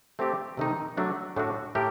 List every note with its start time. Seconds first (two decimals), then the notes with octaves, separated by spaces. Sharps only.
0.19 A3 C4 G4 D5
0.57 C3 D#3 A3 D#4
0.97 F#3 A3 D4 F#4
1.36 A2 A3 D4 F#4
1.75 A2 A3 G4 A#4